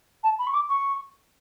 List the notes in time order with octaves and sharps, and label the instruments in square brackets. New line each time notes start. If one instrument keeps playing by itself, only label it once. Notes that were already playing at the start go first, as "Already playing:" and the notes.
[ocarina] A5
B5
C#6
D6
C#6